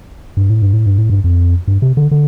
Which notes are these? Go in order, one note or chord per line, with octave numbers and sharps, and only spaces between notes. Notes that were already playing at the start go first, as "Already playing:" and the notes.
G2
A2
G2
A2
G2
A2
G2
F2
G2
C3
D3
D3